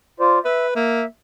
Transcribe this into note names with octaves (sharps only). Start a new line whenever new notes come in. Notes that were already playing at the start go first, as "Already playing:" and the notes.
F4 C5 D5
B4 E5
A#3 E5